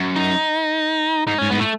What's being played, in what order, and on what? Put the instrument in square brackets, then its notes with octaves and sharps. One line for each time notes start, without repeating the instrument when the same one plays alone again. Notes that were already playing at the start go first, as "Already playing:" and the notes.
Already playing: [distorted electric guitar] F#2
[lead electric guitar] D#4
[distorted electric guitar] G#2 [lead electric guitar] D#4
[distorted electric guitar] G#2 [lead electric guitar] C#4
[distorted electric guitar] G#2 [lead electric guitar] B3
[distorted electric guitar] A2
[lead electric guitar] A3